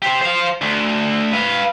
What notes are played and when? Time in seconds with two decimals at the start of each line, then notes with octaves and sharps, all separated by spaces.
0.02 G4 C5
0.21 C5 F5
0.61 D2
1.33 B4 F5